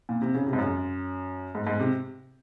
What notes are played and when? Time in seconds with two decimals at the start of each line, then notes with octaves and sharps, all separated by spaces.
0.09 A#2
0.22 C3
0.34 C#3
0.46 C3
0.53 G#2
0.58 F#2
1.55 G#2
1.67 G#2
1.80 C3